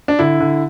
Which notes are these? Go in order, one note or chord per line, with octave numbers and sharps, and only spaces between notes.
D4
D3 E4
D3